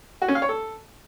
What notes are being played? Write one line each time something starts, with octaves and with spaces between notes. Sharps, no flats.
F#4
C#4
F5
C#5
A4